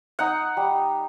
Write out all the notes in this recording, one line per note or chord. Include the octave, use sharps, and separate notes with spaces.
D#4 F#5
G3